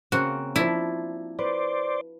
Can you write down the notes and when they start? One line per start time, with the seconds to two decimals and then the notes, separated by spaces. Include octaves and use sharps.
0.12 C#3 A#3 C4 F#4
0.56 F3 D4 E4
1.39 B4 C5 D5